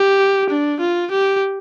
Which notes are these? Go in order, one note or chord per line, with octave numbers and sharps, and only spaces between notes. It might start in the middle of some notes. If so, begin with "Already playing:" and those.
Already playing: G4
D4
F4
G4